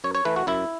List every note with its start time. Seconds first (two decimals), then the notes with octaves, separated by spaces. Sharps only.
0.04 F#2 C#5
0.15 C#5
0.25 E3 A3 B4
0.36 F#4
0.47 F#2 E4